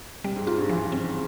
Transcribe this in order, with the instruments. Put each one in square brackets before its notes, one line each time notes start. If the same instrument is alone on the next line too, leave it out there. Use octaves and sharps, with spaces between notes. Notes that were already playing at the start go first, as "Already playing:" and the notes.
[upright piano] C3 [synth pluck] G3
[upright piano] G#2
[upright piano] G#2 [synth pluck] F4
[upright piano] G2
[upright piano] E3 [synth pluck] F3
[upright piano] C#3 [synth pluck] C4